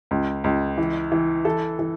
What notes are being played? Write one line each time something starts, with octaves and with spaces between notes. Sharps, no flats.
C#2
C#2
E3
E3
E3 A4
E3